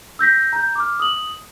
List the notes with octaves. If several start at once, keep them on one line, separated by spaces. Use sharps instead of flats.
E6 G6 A#6 B6
A#5 G6
D6 F6
D#6 F#7